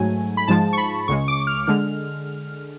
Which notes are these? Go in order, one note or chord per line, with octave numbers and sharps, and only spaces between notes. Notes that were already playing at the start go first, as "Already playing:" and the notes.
Already playing: G#2 F#3 A3 G#5
B5
G#2 F3 G#3 A5
C#6
B5
C#2 C#3 G#3 C#6
D6
F6
D3 G#3 F6